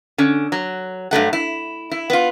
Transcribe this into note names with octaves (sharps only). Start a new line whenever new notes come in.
D3 C#4
F#3
G2 F#3 A3 F#5
E4
E4
B3 F4